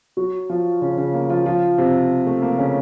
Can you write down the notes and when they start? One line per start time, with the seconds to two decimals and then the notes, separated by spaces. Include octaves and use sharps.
0.17 F#3 F#4
0.49 F3 F4
0.81 C#3 C#4
0.98 C#3 C#4
1.13 A#3
1.30 F3 F4
1.46 F3 F4
1.78 C3 C4
2.27 A3
2.42 A#3
2.58 C#3 C#4